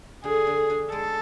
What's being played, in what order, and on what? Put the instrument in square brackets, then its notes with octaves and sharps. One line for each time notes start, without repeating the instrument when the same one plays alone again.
[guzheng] D3 [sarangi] G#4
[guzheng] D3
D4
[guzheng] G#3 [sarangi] A4